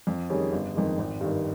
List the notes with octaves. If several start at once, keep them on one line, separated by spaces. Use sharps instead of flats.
F2
D#3 G3 C#4 G#4
G1
F2 D#3 G#3
G#1
G2 D#3